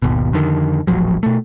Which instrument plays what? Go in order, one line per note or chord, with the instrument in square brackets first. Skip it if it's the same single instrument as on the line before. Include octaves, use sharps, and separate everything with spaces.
[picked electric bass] G#1 D#2 B2
F2 D3 D#3
D#1 A1 F3 F#3
B2 A3